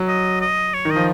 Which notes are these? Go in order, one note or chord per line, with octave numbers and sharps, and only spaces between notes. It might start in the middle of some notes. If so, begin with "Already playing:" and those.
Already playing: F#3
D#5
D#5
C#5
D#3
D#5
F3